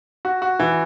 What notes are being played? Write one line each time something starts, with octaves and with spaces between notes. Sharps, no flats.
F#4
F#4
E3